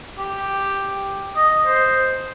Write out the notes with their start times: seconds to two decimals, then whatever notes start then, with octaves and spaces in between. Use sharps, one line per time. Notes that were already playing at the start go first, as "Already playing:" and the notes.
0.18 G4
1.36 D#5
1.66 C5